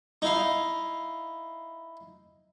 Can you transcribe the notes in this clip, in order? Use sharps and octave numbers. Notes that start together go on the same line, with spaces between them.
D#4 E4 F5